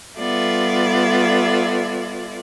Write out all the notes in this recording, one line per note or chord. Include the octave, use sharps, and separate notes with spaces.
G3 B3 F4 A4 D5 E5